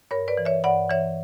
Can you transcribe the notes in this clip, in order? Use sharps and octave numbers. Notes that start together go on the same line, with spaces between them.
G2 A#4 C#5
B4 D5
E3
C#5 E5
G2 D5 F#5
E3 C#5 E5